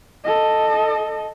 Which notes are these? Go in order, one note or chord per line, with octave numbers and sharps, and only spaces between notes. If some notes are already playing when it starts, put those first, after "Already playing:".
A4 D#5